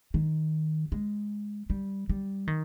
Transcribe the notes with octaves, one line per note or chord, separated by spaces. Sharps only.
D#3
G#3
G3
G3
D#3